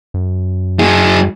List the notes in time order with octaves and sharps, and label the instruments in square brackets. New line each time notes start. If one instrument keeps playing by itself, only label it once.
[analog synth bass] F#2
[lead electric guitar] F#3 G#4